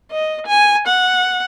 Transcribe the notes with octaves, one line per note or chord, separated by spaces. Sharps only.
D#5
G#5
F#5